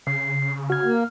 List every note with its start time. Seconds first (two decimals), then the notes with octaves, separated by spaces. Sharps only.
0.07 C#3 C7
0.70 F#4 F6 G#6
0.84 A#3